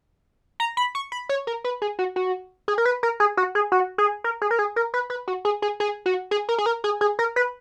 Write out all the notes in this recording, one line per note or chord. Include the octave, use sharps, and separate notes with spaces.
A#5
B5
C#6
B5
C#5
A#4
B4
G#4
F#4
F#4
G#4
A#4
B4
A#4
G#4
F#4
G#4
F#4
G#4
A#4
G#4
A#4
G#4
A#4
B4
B4
F#4
G#4
G#4
G#4
F#4
G#4
A#4
G#4
A#4
G#4
G#4
A#4
B4